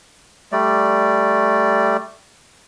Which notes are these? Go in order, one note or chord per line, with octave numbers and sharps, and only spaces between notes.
G3 A3 D5